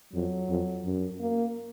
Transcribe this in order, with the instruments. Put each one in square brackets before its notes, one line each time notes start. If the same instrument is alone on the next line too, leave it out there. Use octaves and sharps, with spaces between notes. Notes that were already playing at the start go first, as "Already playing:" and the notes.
[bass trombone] F2 [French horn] F#3
[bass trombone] F2
F#2
[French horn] A#3